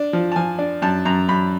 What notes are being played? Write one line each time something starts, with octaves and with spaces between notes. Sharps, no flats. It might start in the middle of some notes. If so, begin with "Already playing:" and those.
Already playing: D4
F3
A5
F3 G#5
D4
F#2 A5
F#2 A#5
F#2 B5